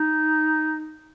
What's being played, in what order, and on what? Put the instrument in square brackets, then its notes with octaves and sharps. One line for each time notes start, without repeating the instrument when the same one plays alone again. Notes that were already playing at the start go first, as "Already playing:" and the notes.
Already playing: [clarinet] D#4